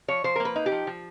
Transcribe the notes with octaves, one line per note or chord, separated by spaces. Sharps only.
F3 C#5
F3 C5
A#3 A#4
B4
D#4
G4
F3
F3